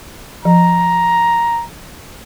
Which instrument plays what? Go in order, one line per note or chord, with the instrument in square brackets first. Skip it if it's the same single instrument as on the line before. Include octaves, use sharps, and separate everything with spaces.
[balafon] F3 [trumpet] A#5